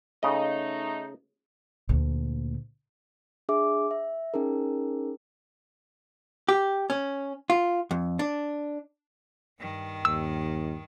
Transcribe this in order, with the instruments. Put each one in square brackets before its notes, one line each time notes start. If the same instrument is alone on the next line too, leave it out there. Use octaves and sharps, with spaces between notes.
[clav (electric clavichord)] C#3 D#5 [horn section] A3 D#4
[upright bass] D2 A#2
[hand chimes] D4 G#4 E5 D6
E5
C#4 D#4 G#4 A#4
[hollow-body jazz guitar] G4
C#4
F4
F2
D4
[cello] G2 D#3
[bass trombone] D#2 [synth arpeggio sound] E6